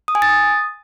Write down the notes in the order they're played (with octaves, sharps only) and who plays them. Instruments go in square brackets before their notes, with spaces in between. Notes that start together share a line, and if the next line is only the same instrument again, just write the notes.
[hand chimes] D#6
G#5
A6
D#6